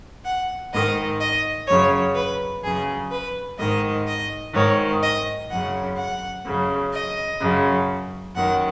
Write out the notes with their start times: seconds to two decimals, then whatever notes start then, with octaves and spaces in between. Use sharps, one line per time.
0.26 F#5
0.73 G#2 D#3 D#5
1.21 D#5
1.68 F#2 C#3 C#5
2.16 B4
2.64 F#2 C#3 G#4
3.12 B4
3.59 G#2 D#3 D#5
4.08 D#5
4.54 G#2 D#3 C#5
5.03 D#5
5.51 F#2 C#3 F#5
5.98 F#5
6.46 F#2 C#3
6.94 D#5
7.41 F#2 C#3
8.36 F#2 D#3 F#5